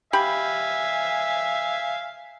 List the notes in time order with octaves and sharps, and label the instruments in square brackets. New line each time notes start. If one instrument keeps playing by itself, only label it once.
[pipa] G4 B5 [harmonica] E5 F5 G#5